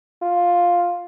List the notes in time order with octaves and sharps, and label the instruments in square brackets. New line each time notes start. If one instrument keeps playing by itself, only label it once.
[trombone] F4